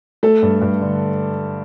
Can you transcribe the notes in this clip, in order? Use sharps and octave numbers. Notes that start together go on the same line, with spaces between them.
A3 A4
G2
G2
D3